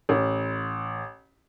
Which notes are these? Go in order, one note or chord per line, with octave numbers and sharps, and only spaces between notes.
A1